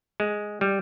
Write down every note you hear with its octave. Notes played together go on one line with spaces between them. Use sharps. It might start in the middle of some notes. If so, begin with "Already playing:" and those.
G#3
G3